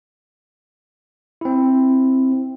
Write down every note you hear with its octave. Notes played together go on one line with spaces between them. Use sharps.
C4 E4